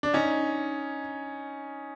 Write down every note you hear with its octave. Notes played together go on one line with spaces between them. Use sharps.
D4
C#4 D#4